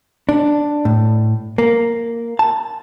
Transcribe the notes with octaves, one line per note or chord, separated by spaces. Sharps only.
D4
A2
A#3
A5